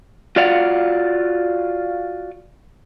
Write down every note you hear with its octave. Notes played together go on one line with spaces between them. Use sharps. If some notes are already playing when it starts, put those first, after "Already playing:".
F4 F#4 D5 F5 F#5